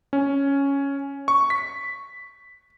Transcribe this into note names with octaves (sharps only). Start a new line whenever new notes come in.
C#4
C#6
B6